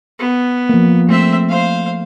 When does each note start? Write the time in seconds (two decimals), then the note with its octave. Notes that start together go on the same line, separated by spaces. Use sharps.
0.19 B3
0.69 F3 A#3
1.09 A3 C4 E5
1.49 C5 F5